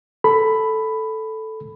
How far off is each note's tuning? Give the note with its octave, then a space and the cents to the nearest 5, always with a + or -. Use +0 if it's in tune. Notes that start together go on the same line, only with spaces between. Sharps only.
A4 +0 B5 +10